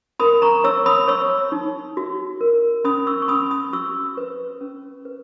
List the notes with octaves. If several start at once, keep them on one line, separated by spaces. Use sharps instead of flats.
A#4 B5 D#6
A#5 C#6
C#5 C#6 E6
B5 D#6
C#5 C#6 E6
D#4
F#4
A#4
C#4 B5 D#6
C#6 E6
C#6
C#4 B5 D#6
B5 D#6
F#4 C#6 E6
B4
C#4
B4